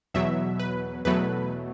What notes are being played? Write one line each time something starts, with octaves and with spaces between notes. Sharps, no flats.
E2 B2 F#3 E5
B4
E2 B2 F#3 A3 B4